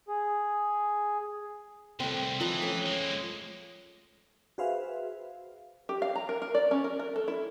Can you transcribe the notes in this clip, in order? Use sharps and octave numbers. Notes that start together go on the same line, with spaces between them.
G#4
C2 A3 C4
E3 F3 D#5 A#5
A3 C#4
G#3 A#3
F#4 G#4 B4 C5 E5 F5
G4
F5
A#5
A#4
A#4
D5
C#4
A#4
A#4
A4
E4